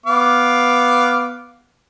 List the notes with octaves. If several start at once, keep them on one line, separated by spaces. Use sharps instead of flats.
B3 F5 D6